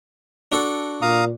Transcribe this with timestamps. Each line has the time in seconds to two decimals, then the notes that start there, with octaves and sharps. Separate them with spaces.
0.52 D4 F#4 A4
1.02 A#2 F5 A#5 D#6